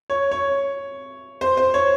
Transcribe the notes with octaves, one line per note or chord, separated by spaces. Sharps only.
C#5
C#5
C5
C5
C#5